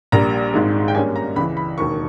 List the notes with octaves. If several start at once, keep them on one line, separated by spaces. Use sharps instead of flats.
A#1 A#2 G3 A#5
G#1 G#2 D#3 G#3
G5
G2 G3 A#3 C#4 G#5
A#5
C#2 C#3 E3 B5
B5
E1 D#2 D#3 A#3 C#6